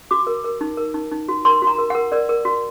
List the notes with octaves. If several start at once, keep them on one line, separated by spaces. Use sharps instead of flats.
F#4 D6
A#4
A#4
D#4
A#4
D#4
D#4
F#4
A#4 C6
F#4
A#5
A#4
F#5
A#4
A#4 D5
A#4
F#4